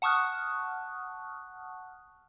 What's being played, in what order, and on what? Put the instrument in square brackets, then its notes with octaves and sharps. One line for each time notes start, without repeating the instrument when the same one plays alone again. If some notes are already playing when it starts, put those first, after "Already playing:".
[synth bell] F#5 A5 C#6 D#6 F6 F#6